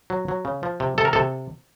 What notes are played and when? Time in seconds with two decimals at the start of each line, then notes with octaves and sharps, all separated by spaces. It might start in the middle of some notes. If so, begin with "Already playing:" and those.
0.10 F#3
0.28 F#3
0.45 C#3
0.63 F3
0.80 C3
0.98 C3 A4
1.05 A#4
1.13 C3 A4